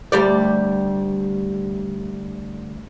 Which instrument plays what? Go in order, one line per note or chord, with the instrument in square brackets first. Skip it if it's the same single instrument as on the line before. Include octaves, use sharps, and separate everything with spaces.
[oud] D2 G3 D5